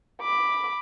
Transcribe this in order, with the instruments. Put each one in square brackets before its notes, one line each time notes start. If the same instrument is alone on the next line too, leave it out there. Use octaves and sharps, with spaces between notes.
[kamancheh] B5 D6